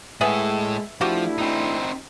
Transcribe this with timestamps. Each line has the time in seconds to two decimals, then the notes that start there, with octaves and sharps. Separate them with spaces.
0.21 A2 G#3 B3 G#4 A4 E5
1.01 F3 A3 D4 E4 F#4 G4
1.38 C4 D#4